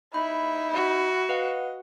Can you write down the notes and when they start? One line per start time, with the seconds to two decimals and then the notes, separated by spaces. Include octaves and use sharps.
0.14 D#4 E4 B5
0.74 F#4
1.29 B4 D#5 F5 F#5